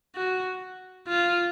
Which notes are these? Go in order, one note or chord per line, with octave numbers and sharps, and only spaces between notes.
F#4
F4